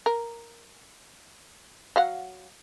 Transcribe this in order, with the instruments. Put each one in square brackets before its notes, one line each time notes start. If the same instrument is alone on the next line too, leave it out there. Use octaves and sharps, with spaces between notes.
[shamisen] A#4
F#3 F5 F#5